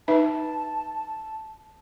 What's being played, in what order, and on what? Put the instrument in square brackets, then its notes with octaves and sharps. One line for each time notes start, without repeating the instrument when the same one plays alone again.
[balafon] D#4 B4 E5 [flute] A5